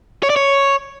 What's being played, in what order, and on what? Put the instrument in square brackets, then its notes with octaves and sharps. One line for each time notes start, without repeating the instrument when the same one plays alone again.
[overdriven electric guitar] C#5
D5
C#5